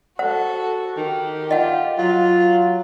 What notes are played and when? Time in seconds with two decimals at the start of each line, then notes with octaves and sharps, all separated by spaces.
0.19 F#4 A4 C5 F#5
0.97 D#3 G4
1.51 F4 D#5 F#5
1.98 F#3 F4